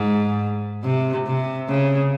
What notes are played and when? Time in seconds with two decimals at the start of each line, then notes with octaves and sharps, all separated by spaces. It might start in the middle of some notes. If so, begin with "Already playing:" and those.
Already playing: G#2
0.84 C3
1.26 C3
1.68 C#3